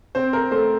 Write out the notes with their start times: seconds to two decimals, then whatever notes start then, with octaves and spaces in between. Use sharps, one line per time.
0.15 C4 C5
0.33 A#4
0.51 A3 C5